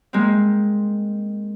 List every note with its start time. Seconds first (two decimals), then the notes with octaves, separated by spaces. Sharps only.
0.13 G#3 A#3 C4